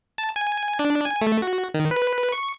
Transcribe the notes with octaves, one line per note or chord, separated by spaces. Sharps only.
A5
G#5
D4
G#5
A3
F#4
D#3
B4
C#6